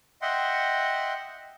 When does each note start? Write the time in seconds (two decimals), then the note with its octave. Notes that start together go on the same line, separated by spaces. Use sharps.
0.22 D#5 E5 F#5 G5 C6